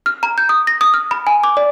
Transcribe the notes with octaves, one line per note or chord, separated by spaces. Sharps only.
F6
A#5
G6
D#6
A#6
D#6
F6
B5
G#5
D6
D5